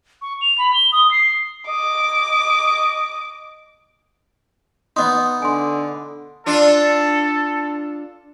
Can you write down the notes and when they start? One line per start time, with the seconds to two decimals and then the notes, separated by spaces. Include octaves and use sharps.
0.22 C#6
0.41 F7
0.58 B5
0.74 G7
0.92 D#6
1.11 C7
1.68 D#5 D6
4.96 B3 D#4 D#5 C6
5.42 D3 G#5 C6
6.46 D4 F4 A4